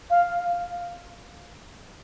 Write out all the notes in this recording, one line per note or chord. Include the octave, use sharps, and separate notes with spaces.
F5